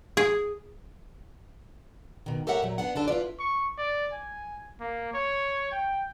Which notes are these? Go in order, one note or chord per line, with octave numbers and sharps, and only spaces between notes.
G#4
B2 D#3
G4 A4 A#4 C#5 E5 F#5
A#2 F#3
B3 D4 F#5
F#2 D3 D4 A4
E4 F4 B4 D5
C#6
D5
G#5
A#3
C#5
G5